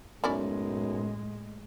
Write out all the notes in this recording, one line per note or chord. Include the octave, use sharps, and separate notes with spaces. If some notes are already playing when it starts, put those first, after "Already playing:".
B1 F#2 A2 G#3 C#4 E4 D5